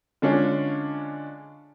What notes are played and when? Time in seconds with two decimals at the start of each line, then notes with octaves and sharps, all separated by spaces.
0.22 D3 G#3 C#4 D4 F4 C#5